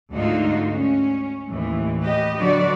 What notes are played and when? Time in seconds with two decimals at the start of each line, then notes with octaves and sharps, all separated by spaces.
0.13 D2 G#2 D3 D#4 F4 F#4
0.73 C#4
1.49 D#2 A2 E3
2.02 G4 B4 D#5
2.37 D3 F#3 D4 F#4 B4 D5